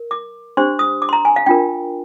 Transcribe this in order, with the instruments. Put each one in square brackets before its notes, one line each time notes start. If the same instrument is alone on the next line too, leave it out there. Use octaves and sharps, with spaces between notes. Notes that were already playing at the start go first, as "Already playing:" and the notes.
Already playing: [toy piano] A#4
D6
D4 G4 C5 C6
D#6
D6
C6
A#5
G#5
F5
D4 F4 A#4 G5